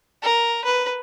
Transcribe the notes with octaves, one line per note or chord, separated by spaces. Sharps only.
A#4
B4